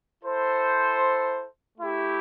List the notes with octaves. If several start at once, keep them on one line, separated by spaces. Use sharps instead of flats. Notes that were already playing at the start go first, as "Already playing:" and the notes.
E4 A4 C5
A3 E4 G4